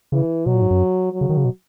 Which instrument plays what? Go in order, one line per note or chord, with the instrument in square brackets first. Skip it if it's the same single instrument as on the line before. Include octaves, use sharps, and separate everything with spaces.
[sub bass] C#3 [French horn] E3
[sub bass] B2 [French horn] F#3
[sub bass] A#2
G#2
F#2
[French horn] F#3
[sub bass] C#3
D#3
C#3
B2